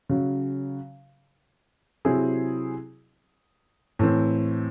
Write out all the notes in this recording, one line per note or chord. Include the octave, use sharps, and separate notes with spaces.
C#3 F#3 C#4
C3 F#3 C4 E4 G#4
A2 E3 C4